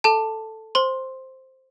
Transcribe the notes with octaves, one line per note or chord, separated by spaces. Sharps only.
A4 A5
C5 C6